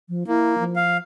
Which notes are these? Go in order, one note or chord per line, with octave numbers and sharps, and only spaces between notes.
F3
A#3 E4
F3
F5